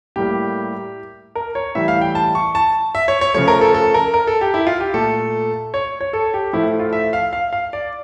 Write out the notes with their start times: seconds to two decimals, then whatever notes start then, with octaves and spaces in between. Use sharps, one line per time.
0.16 A2 G3 A#3 G4
1.35 A#4
1.55 C#5
1.75 A2 E3 G3 E5
1.88 F5
2.01 G5
2.15 A5
2.35 C#6
2.55 A5
2.95 E5
3.08 C#5
3.21 C#5
3.34 C#3 F3 A3 C#5
3.48 A#4
3.61 A4
3.74 A4
3.94 A#4
4.14 A#4
4.27 A4
4.41 G4
4.54 E4
4.67 F4
4.80 G4
4.94 A#2 A3 A4
5.74 C#5
6.01 C#5
6.13 A4
6.34 G4
6.53 A2 F3 A3 E4
6.79 F4
6.93 E5
7.13 F5
7.33 F5
7.53 F5
7.73 D5